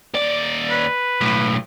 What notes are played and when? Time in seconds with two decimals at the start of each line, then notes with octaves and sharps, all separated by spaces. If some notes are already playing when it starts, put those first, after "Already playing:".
0.15 D#2 D5
0.70 B4
1.21 B1 A2